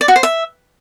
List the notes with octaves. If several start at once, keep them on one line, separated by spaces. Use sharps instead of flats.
D5
F#4
C5
E5